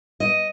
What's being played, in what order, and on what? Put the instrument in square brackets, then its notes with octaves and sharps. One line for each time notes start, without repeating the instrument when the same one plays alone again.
[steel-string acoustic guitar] D#5